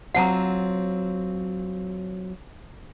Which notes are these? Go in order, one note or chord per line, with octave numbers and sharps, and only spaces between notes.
F#3 C4 F4 F#5 A5 A#5